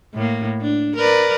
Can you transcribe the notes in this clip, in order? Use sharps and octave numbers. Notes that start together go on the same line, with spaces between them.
A2 A#3
D4
A#4 B4 D5